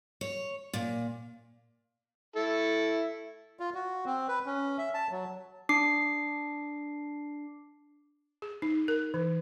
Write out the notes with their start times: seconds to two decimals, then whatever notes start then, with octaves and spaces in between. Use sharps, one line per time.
0.21 C#5
0.73 A#2
2.36 E4 A4
3.60 F4
3.74 F#4
4.06 C4
4.28 B4
4.46 C#4
4.78 E5
4.94 A5
5.11 F#3
5.69 D4 D6 C7
8.42 G#4
8.62 D#4
8.88 A#4
9.14 E3